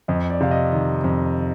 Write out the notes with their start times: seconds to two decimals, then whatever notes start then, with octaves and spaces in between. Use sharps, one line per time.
0.08 F2 D#5
0.30 D5
0.41 C3 F5
0.51 D#5
0.73 D#3
1.04 F2